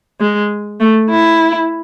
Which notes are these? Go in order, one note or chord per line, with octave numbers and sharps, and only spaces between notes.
G#3
A3
E4